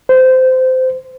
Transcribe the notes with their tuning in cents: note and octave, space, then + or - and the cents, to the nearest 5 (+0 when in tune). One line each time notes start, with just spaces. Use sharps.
C5 -20